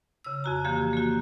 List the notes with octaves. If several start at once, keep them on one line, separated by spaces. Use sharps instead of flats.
C#3 E6
F2 F#4 A#5
D3 E3 F3 A#3 G4
A#3 F#4